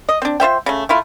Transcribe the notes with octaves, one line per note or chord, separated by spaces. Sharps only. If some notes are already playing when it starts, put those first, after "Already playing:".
D#5
C4 D4
F4 C5 E5 G5
C#3 A3
A3 E4 F4